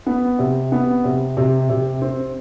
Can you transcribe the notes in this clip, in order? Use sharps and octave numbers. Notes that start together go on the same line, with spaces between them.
B3
C3
B3
C3
C3
C3
C4